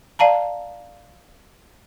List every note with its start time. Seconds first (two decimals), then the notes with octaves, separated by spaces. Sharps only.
0.19 D5 F5 A5 A#5